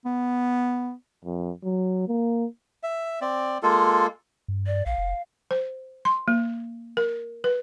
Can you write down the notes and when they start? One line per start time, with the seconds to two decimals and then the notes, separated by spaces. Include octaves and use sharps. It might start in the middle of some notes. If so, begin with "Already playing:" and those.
0.05 B3
1.25 F2
1.64 F#3
2.08 A#3
2.83 E5
3.21 C4 D5
3.63 G#3 A#3 F4 A4
4.48 G2
4.67 D5
4.86 A#1 F5
4.98 F1
5.51 C5
6.05 C6
6.28 A#3
6.97 A#4
7.44 B4